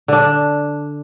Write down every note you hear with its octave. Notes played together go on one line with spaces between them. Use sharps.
D3 D4